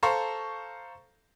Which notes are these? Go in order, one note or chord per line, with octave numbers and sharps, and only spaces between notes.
A4 C5 F5 A#5 C#6